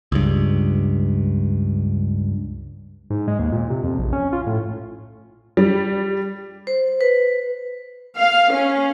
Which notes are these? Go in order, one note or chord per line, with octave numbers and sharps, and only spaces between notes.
C#2 G2
G#2
G#3
D#2
A#2
C3
F2
A#1
C#4
F4
A2
G3
C5
B4
F5
C#4